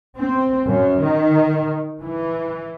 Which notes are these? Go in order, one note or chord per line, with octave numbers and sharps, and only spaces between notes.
C4
F#2
D#3
E3